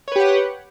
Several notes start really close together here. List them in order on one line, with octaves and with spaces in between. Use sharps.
C#5 B4 G4 F#5